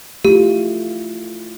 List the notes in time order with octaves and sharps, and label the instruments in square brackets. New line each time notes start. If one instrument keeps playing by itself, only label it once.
[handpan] A3 E4 F4 [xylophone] G4